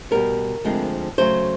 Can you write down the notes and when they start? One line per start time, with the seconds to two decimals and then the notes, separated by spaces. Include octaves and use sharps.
0.11 B2 G3 B3 A#4
0.64 D2 D3 F3 G#3 C4
1.18 C#3 F#3 A3 C5